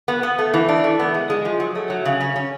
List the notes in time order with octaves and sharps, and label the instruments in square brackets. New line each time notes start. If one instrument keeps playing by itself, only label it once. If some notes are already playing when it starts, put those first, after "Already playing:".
[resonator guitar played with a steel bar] B3
B3
A3
E3
D4
A3
B3
G#3
G#3
F3
F#3
A3
F#3
C#3
C#4
C#4